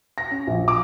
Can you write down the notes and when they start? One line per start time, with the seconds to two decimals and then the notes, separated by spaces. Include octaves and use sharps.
0.18 A#6
0.31 C#4
0.47 A#1
0.68 D6